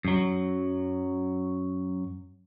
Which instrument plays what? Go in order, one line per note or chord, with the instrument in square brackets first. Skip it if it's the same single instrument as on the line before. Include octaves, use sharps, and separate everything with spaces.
[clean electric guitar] F#2 F#3